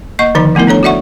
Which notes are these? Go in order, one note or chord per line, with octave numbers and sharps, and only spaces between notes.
A#3 D#5 C#6
D3 D#3 F3 D#4 A#5 B5
F3 A3 B3 E4 A#4
D4 A4 C#5 A#5
F#4 A4 D5 E5 F#5 C#6